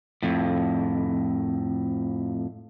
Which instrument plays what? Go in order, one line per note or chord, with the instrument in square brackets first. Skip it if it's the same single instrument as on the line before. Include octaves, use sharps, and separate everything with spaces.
[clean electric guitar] F2 A2